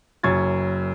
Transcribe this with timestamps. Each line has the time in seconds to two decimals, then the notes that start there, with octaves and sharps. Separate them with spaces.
0.23 F#1 F#2 C#6 G#6 A6